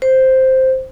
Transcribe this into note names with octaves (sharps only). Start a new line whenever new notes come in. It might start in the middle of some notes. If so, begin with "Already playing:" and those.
C5